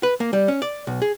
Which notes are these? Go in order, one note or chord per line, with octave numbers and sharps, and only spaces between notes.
B4
A#3
G3
C#4
D5
B1
G#4